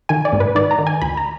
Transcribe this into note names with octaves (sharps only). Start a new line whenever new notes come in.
D#3 G#5
D5
G#2
B4
D#3 D5
A#5
D#3
G#5
D2 B5
A#5